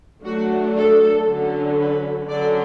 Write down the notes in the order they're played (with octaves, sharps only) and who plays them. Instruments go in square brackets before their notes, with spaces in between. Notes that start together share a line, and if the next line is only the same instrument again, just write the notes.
[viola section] F#3 A3 D4 F#4
A4
D3 F#3 C#4
B4
D3 F#3 C#4 D5